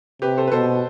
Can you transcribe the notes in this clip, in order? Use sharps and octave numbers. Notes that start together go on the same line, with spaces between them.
C3 G4 B4
A4 C5
B4
B2 A4 C5